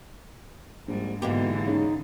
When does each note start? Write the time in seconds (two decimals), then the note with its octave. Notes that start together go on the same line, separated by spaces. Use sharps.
0.88 A#1 G#2 G3
1.22 G#2 B2 D3 E3 A#3 G4
1.67 C#3 D#4